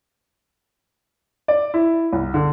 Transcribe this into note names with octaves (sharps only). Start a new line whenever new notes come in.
D5
E4
C2
D3